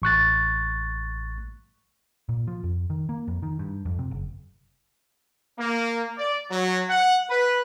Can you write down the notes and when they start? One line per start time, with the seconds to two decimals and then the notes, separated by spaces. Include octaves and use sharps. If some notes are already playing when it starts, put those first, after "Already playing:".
0.02 A1 C#6 F#6 A6
2.29 A#2
2.47 F3
2.64 F2
2.90 D#3
3.09 A#3
3.28 F2
3.43 D#3
3.59 G2
3.85 F2
3.99 C3
4.11 F#1
5.59 A#3
6.18 D5
6.50 F#3
6.89 F#5
7.30 B4